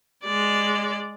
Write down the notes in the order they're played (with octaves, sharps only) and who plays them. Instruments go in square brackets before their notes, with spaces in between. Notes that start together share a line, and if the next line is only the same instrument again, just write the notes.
[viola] G#3 D5